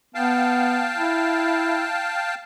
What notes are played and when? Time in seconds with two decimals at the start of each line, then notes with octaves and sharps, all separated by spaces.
0.15 B3 F5 G5 A5
0.97 E4